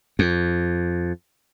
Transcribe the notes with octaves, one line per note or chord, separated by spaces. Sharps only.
F2